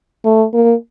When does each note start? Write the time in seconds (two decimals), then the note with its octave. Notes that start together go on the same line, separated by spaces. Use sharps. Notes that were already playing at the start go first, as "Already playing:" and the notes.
0.25 A3
0.54 A#3